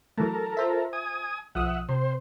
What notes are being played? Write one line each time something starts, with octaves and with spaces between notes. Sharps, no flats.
E3 F#3 A3 A4 A#4
F4 C5 E5
G#5 D#6
B1 F3 E5 F#5 D#6
C3 C5